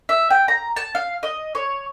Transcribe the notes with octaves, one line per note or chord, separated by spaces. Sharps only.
E5
G5
A#5
A5
F5
D#5
C#5